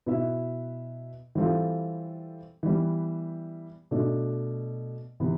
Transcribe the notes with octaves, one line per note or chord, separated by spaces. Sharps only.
B2 B3 E4 B4 E5
E3 G3 C4 F4 A4
E3 G3 B3
B2 A3 D4
C3 E3 B3